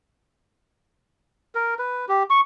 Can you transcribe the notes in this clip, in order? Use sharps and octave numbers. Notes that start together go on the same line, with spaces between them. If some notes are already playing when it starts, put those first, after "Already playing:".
A#4
B4
G4
C#6